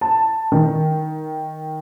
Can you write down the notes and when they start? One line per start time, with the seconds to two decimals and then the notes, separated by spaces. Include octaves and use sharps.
0.01 A5
0.52 D#3